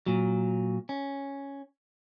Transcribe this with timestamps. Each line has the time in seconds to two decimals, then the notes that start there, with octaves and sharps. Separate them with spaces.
0.06 A#2 F#3
0.89 C#4